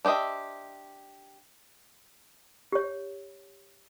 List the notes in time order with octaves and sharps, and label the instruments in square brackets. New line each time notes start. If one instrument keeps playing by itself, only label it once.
[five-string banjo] D4 G4 C5 D#5 E5
[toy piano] G4 C#5